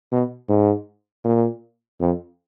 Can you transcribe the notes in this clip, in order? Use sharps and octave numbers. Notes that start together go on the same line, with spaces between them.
B2
G#2
A#2
F2